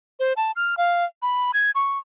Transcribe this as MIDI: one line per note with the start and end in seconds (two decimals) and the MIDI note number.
0.20 0.33 72
0.37 0.51 81
0.56 0.75 89
0.77 1.05 77
1.22 1.52 83
1.54 1.71 92
1.75 1.98 85